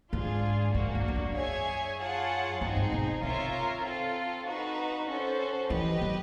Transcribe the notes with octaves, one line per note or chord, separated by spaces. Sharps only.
G#2 D4 F4 G#4
G#2 A#3 D4 F#4
F2
F2
F#2
G#4 C#5 E5 G#5
F4 G#4 C#5 F#5 A5
G2 C4 D#4 G#4
G#2
B2
C3 F4 A#4 C#5 E5
C4 F4 A4
D#4 F#4 B4
C#4 F#4 A4 C5
E3 G4 B4 D#5
F#3